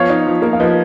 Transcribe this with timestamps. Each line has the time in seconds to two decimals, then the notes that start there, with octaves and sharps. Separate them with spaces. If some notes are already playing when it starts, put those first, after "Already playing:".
Already playing: F3 B3 C#5 F5
0.10 D#4
0.27 F3
0.42 A#3
0.53 F5
0.60 F3 B4 D#5